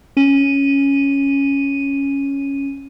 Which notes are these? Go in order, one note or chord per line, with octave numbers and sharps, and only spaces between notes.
C#4 D#7